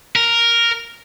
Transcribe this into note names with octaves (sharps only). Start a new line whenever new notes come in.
A#4